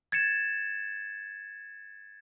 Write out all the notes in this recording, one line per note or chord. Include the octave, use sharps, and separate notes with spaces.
G#6 A6 C#7 E7